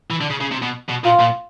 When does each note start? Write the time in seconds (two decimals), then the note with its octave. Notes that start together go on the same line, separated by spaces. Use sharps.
0.10 E3
0.21 D3
0.30 C#3
0.41 C#3
0.52 C3
0.63 B2
0.89 B2
1.04 A#2 F4
1.20 A#2